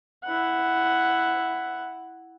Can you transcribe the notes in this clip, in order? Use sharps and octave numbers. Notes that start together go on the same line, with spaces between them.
E4 F#5